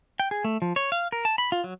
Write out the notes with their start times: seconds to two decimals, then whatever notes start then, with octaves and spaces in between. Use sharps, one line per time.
0.20 G5
0.31 G#4
0.44 A3
0.62 F3
0.76 C#5
0.92 F5
1.12 A#4
1.25 A5
1.38 B5
1.52 F4
1.64 F#3